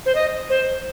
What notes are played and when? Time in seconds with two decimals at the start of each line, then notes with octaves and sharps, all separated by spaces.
0.06 C5
0.15 D#5
0.50 C5